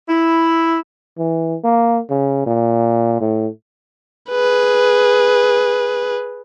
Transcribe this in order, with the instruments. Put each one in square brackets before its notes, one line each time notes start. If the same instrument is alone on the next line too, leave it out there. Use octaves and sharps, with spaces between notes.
[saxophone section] E4
[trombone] E3
A#3
C#3
A#2
A2
[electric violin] G#4 B4